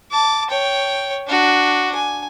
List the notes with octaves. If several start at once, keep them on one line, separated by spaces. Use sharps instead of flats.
A5 D6
C#5 G5
D4 F#4
G#5